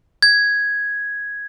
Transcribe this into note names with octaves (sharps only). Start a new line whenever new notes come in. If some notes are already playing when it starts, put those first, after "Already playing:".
G#6